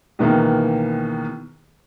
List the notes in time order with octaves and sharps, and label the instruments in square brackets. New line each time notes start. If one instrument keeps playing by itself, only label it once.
[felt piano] C#2 B2 D#3 E3 A#3